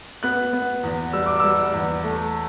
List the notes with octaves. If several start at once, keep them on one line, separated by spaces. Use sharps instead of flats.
B3 F#6
B3
E2
G3 E6
D6
G3 E6
E2
A3